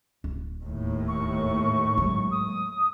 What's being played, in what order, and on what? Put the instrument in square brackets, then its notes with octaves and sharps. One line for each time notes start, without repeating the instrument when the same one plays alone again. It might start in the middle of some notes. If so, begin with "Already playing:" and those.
[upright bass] D1
[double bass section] D#2 A2
[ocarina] C#6
[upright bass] F#3 G#3
[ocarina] D#6